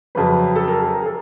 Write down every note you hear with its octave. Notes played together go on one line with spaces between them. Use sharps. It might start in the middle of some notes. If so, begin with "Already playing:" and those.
F2 C#3 F#3 B4
A4
A#4
G#4
A#4
G#4
A4